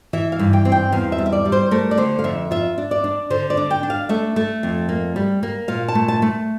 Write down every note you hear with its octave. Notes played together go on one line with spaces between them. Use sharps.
E3 E5
F5
G2
G5
C4
G5
E2 F5
E5
G3
E5
D5
G3
C5
A3 A#4
D5
D3 C5
F5
F2 E5
F4 E5
D4
D5
D4
D3 C5
D5
D4
G5
D4
F5
A3 E5
A3
F2
A#3
G3
A#3
A#2 F5
A5
A3
A5
A3